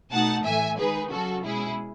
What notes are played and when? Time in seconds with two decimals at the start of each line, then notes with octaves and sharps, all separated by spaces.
0.11 B2 A3 D#4 F#5 A5
0.45 A2 E3 A3 E5 G#5
0.78 D#3 G#3 D#4 G#4 B4
1.11 C#3 F#3 C#4 F#4 A4
1.45 B2 G#3 C#4 E4 G#4